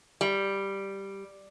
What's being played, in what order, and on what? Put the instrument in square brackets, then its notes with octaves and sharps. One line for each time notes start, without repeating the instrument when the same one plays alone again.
[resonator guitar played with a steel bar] G3